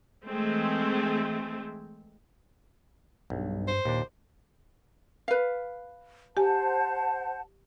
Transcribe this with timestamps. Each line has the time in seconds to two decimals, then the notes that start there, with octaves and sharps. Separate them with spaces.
0.25 E3 G#3 A3 C4
3.30 B1 G2
3.68 C5
3.86 D#2 A#2 D4
5.28 B4 F5
6.37 G4 C5 F#5 G#5 A5